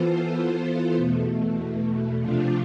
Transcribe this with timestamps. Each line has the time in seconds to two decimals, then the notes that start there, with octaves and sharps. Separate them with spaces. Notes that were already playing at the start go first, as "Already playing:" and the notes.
Already playing: E3 B3 F4 A4 C5
0.95 E2 B2 A3
2.20 C3 F3 A3 D4 F4